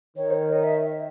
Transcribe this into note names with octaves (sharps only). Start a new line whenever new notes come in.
D#3 C#5
C5
C#5
D#5
E5